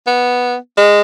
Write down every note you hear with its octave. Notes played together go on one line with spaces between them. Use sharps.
B3
G#3